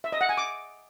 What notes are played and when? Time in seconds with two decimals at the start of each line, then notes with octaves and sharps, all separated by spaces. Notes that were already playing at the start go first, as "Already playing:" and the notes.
0.04 E5
0.12 D#5
0.21 F#5
0.29 G#5
0.38 D6